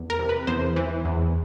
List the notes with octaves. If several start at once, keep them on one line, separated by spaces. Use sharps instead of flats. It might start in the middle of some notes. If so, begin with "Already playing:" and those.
Already playing: E2
A#4
C3
B4
E2 C5
E3
E2